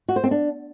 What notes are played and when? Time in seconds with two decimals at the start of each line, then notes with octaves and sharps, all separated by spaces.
0.09 F#4
0.16 C5
0.24 C4
0.31 D4